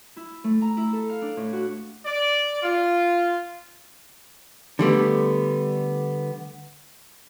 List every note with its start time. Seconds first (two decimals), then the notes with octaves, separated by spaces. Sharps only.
0.16 E4
0.44 A3
0.61 A#5
0.77 E4
0.93 A4
1.09 F5
1.22 D4
1.37 A2
1.53 F#4
2.06 D5
2.63 F4
4.79 D3 G3 A3 B3